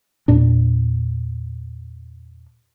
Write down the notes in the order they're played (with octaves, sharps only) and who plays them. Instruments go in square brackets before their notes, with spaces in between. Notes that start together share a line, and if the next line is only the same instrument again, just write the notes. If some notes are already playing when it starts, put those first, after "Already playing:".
[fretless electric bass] E2 A#2 D4